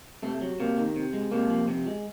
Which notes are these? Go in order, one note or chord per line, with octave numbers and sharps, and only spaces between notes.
C3 A3
F#3
C3 A#3
D#3
C3
G#3
C3 A#3
F3
C3
G#3